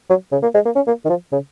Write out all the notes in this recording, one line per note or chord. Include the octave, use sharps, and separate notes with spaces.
F#3
C#3
A#3
G#3
A#3
C#4
A#3
D#3
F3
C#3